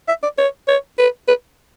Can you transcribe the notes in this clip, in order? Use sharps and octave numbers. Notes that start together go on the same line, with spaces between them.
E5
D5
C#5
C#5
B4
B4